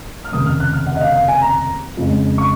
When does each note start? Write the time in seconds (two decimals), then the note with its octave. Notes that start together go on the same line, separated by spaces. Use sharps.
0.24 F6
0.32 F1 D#2 C#3 D#6
0.46 F6
0.60 F#6
0.73 F6
0.87 F#5
0.96 D#5
1.01 F5
1.14 F5
1.28 G#5
1.41 A#5
1.97 F2 C#3 G#3
2.38 C#6